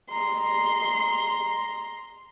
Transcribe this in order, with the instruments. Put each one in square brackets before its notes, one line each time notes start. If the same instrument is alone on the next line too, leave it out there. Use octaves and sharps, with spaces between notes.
[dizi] A#5 [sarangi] C6